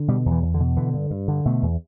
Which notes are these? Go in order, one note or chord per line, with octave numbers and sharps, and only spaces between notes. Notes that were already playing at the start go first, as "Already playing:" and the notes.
Already playing: D3
B2 G3
E2
E3
E2
D3
B2
D3 E3
G2
G2
D3
B2 A3
E2